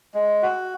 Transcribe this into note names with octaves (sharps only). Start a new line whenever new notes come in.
G#3
F#4